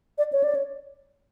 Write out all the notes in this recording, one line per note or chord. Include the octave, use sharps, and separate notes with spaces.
D5
C#5
D5
C#5